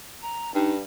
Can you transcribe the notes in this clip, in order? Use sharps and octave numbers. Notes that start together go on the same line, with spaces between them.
A#5
G2 D#4